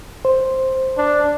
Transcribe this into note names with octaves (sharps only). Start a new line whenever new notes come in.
C5
D4